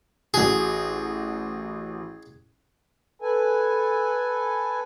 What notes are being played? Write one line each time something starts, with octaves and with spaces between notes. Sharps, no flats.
A1 F#4 G#4
A4 B4 G#5